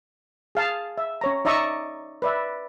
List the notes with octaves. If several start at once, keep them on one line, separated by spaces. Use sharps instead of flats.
G#4 F5 A5
E5
C#4 C#5 A#5
D#4 D5 E5 A#5 C#6 D#6
B4 D5 E5